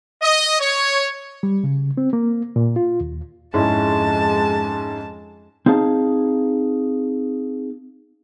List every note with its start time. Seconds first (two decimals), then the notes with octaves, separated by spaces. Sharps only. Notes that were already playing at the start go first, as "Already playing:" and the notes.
0.22 D#5
0.60 C#5
1.43 G3
1.64 C#3
1.97 C4
2.13 A#3
2.56 A#2
2.76 F4
3.01 D#2
3.54 F2 G#2 G#3 C#4 E4 A5
5.66 C4 D#4 G#4 F5 A5